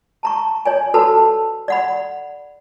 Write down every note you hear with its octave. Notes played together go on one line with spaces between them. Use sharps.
A5 A#5 C#6
C#5 D5 G#5
F#4 A4 B4 A5 B5 E6
D5 F#5 B5